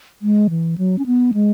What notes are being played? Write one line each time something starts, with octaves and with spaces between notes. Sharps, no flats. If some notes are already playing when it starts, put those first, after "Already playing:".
G#3
E3
F#3
C#4
B3
G#3